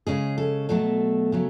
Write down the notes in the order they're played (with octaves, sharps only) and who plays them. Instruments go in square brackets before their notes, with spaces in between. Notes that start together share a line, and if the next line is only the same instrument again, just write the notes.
[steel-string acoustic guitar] C#3 G#3 C#4 G#4
A4
B2 F#3 A3 A4
C#3 F#3 A3